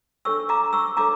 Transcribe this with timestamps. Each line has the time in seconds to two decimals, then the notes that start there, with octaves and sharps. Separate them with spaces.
0.25 D4 A4 C#5 C#6 E6
0.49 A#5 D6
0.73 C#6 E6
0.97 D4 A4 C#5 A#5 D6